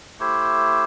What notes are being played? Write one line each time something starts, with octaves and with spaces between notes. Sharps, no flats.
A3 E4 G4 C5